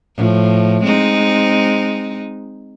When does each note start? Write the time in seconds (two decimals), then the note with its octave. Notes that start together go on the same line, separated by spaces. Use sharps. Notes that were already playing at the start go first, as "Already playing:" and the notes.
0.16 A2 F3
0.84 G#3 C4 D#4